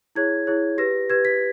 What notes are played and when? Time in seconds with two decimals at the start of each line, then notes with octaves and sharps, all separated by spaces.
0.15 E4 G#4 C#5 G#6
0.47 E4 G#4 C#5
0.78 G4 B4 A#6
1.10 G4 B4 G#6
1.25 B6